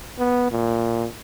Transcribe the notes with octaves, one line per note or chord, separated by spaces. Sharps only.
B3
A#2